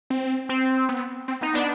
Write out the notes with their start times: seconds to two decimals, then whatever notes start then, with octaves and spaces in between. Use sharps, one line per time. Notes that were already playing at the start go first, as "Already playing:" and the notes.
0.10 C4
0.49 C4
0.89 B3
1.28 C4
1.41 B3 D#4
1.53 B3 D4